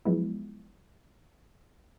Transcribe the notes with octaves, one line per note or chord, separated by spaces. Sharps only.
F3 F#3 G#3 B3 E4